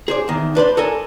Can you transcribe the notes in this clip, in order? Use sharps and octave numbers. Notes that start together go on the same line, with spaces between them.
G#4 C5 D5
E2 D#3
D4 B4 C5 D5
A4 A#4 D5 G#5